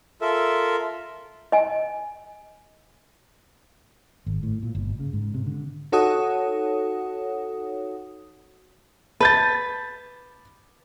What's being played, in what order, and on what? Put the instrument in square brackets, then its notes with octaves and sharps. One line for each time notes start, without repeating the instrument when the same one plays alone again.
[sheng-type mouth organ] F4 A4 A#4 E5
[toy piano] D#5 G#5
[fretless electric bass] G#1
A2
A#2
G1
C#3
G#2
C3
D3
[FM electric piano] D#4 F#4 A4 C#5 F#5 D#6
[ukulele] B4 [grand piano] A5 G6 A6